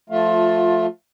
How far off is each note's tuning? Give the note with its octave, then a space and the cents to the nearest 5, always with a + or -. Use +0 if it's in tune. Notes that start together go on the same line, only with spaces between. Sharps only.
F3 +0 A3 +0 F4 +20